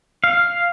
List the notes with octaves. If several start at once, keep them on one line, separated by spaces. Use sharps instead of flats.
F5